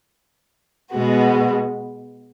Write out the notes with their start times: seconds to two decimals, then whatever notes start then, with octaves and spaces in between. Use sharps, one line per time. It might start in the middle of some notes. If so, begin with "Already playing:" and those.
0.91 B2 G#3 B3 F#4